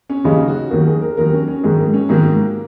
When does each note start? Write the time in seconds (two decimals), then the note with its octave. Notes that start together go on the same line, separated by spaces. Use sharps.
0.10 C#4
0.24 D#2 C#3 F#3 D#4
0.48 F#4
0.70 D#2 D#3 F#3 A#4
0.86 G#4
1.02 A#4
1.17 D#2 D#3 F#3 A#4
1.33 C#4
1.48 C#4
1.63 G#2 D#3 F#3 G#3
1.79 A#3
1.94 C#4
2.09 G#2 D#3 F#3 A#3